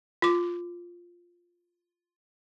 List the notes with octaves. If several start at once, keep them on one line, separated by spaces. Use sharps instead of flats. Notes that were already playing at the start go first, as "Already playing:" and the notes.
F4 D6